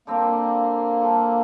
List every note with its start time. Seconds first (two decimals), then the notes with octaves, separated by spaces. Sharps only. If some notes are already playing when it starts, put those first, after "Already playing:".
0.07 D3 G3 A#3 C4 G4
1.01 G3 D4 F4 A4